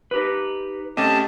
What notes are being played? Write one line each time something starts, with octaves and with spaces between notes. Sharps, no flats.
D#4 G4 B4
C3 A3 C#4 G4 D#5 A5